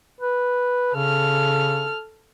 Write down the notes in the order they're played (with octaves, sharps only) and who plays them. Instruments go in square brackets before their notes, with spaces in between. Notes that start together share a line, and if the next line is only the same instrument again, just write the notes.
[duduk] B4
[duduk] C#3 [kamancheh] A4 F6